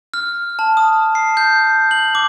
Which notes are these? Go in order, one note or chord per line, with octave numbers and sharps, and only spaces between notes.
F6
A5
D#6
C7
G6
F#7
D6